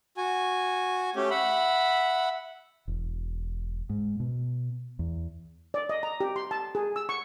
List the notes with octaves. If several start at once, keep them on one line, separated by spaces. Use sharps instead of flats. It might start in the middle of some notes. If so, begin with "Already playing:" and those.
F#4 G#5
A3 C#4 G4
E5 F#5 B5
E1
G#2
B2
E2
D5
D#5
A#5
G4
C6
A5
G#4
E6
C#6